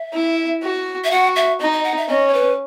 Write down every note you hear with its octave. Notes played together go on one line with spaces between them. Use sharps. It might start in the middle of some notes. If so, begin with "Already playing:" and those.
Already playing: E5
E4
F#4
E5
F#4 F#5
E5
D#4 D#5
D#5
F#5
E5
C#4 D#5
C#5
B4